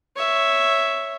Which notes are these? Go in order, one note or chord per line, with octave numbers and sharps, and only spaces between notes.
C#5 E5